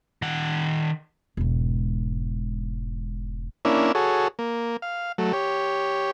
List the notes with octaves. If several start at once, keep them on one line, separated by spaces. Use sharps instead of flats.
D#3 F#5
E1 G#2
A#3 C#4 D4 E4
F#4 G#4 A4 C#5
A#3
F5
F#3 A3
G4 C#5